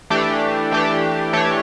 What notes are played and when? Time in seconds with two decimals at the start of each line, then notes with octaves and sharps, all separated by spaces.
0.10 E3 A3 D4 G4
0.71 E3 A3 D4 G4
1.33 E3 A3 D4 G4 C#5